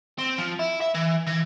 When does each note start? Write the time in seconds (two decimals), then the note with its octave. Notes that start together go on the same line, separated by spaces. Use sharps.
0.19 C4
0.38 F3
0.59 E4
0.81 E5
0.94 E3
1.27 E3